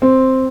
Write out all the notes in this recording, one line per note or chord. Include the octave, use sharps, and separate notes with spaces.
C4